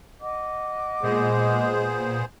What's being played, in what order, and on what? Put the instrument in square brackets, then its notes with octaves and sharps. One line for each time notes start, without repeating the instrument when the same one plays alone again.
[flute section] D#5 F#5 D6
[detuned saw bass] A#2 [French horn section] G#3 [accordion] B3 G#4 C5